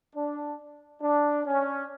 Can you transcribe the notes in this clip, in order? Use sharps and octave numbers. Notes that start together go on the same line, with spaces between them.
D4
D4
C#4